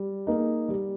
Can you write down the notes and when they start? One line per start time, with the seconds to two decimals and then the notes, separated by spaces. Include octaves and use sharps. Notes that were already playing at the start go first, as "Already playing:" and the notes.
Already playing: G3
0.27 A#3 D#4 G#4
0.69 G3